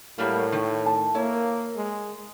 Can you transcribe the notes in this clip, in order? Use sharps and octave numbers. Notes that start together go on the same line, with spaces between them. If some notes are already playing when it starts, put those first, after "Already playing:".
A2 F#3 G3 A#3
D#3
A5
A#3 E4 C#5
G#3